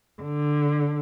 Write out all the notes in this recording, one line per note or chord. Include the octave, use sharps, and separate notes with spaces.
D3